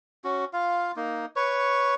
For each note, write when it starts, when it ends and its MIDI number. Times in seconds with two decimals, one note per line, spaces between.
0.24 0.45 61
0.24 0.45 66
0.53 0.92 65
0.53 0.92 77
0.96 1.26 58
0.96 1.26 63
1.36 1.95 71
1.36 1.95 73
1.36 1.95 85